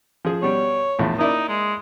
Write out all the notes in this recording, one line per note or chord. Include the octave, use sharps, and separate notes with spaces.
F3 G#4
B2 G3 C#5
A#1 E2 A2
A#3 D#4 E4 D5
G#3